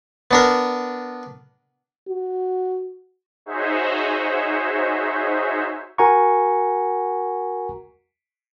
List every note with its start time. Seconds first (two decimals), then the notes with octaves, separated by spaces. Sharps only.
0.31 B3 D4 A#4
2.09 F#4
3.46 D#4 F#4 G#4 C5 C#5 E5
5.98 F#4 A#4 F#5 G#5 A#5 C#6